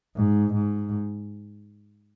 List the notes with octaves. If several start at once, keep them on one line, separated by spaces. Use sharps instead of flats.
G#2
G#2